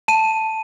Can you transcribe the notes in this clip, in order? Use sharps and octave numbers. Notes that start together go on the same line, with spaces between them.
A5 D#7